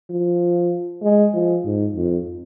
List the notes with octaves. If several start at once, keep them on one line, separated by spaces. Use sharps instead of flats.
F3
G#3
F3
G#2
F2